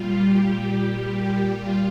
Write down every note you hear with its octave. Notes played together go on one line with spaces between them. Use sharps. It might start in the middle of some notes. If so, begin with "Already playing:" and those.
Already playing: A#2 G3 F4
G4
F4